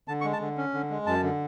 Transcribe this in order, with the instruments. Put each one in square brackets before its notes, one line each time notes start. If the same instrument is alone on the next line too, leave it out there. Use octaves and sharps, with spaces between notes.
[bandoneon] D3 A5
C#6
G#3
A5
D3
C#4
D3
G#3
F#2 A5
D3